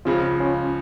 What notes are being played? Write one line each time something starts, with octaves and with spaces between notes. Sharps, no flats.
C#2 C#3 F3 C#4 F4
C#4 F4